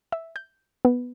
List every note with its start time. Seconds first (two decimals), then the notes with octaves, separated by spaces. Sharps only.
0.12 E5
0.36 G6
0.85 B3